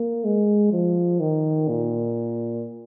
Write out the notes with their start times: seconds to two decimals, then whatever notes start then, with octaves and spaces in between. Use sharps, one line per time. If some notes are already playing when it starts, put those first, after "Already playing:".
Already playing: A#3
0.25 G#3
0.72 F3
1.20 D#3
1.69 A#2